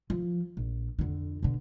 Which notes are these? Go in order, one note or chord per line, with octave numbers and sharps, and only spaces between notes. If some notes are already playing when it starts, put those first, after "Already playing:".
F3
A#1
F2 D3
B2 D3